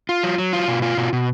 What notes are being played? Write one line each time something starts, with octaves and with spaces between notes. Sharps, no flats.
F4
F#3
F#3
F4
B2
F4
B2
B2